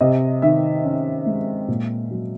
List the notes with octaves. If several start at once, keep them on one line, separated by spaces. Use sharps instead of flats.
C3 D#5
D#3 E5
C#4
G#3
A#2
F#3